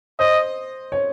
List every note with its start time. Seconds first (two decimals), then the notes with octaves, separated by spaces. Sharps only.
0.19 C5 D#5
0.92 C#5